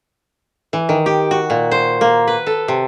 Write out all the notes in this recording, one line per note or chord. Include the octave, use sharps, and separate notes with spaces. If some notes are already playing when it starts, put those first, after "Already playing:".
E3
D#3
G4
F#4
A#2
C5
A#3
B4
A4
C3